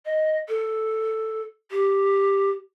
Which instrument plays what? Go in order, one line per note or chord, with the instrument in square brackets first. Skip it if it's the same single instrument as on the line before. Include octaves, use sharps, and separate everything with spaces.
[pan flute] D#5
A4
G4